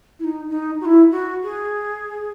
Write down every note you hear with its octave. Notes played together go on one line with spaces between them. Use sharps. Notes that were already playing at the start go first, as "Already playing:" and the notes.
E4
D#4
D#4
F#4
E4
F#4
G#4